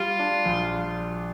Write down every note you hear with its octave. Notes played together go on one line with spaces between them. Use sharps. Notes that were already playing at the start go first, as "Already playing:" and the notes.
Already playing: G3 F4
D4
A#1